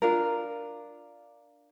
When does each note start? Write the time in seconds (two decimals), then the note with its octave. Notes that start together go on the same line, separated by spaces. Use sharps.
0.02 D4 F4 A#4